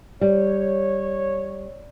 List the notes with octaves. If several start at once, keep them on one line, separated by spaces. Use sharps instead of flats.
G3 C#5